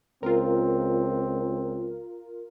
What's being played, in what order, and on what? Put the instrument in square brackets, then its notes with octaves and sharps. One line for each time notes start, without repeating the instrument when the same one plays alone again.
[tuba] C#2 [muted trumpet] C4 [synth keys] F4 A#4